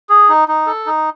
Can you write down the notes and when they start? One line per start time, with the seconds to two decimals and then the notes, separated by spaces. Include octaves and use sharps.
0.09 G#4
0.29 D#4
0.48 D#4
0.66 A4
0.86 D#4